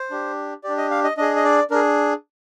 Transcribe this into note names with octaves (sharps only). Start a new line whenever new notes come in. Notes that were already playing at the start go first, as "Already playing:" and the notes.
Already playing: C5
D4 G4
D4 G4 D5
D#5
F5
D#5
D4 G#4 D#5
D#5
D5
D4 G#4 A#4